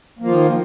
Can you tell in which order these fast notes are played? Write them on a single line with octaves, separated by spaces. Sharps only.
A#3 F3 F4 D#3